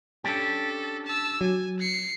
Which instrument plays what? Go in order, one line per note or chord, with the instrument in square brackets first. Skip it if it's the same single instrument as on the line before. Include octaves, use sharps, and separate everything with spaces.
[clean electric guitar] C#4 D4 G4 [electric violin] A4
[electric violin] A5 E6
[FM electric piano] F#3 [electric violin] G#5
[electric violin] C7 C#7